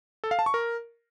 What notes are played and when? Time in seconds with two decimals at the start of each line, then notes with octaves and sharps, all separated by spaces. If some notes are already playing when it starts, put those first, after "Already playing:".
0.24 A4
0.31 F5
0.39 A5
0.46 C#6
0.54 A#4